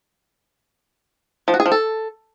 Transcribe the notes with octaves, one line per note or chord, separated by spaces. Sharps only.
F3
F#4
G#4
F3
A4